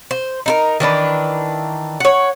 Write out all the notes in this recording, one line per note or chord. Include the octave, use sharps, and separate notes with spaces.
C5
D#4 E4 A#4
D#3 E3 D4 B4
C#5 F#5